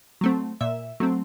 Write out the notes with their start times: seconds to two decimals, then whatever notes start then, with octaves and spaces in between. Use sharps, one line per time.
0.21 F#3 A3 C4
0.61 A#2 E5
1.00 F#3 A3 C4